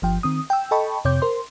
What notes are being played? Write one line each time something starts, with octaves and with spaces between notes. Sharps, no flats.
G1 F3 G5
D#3 C4 D#6
G5 E6
A4 D#5 G5 A5 B5 C#6
F2 C3 C#5 D6 G6
A#4 C5 C6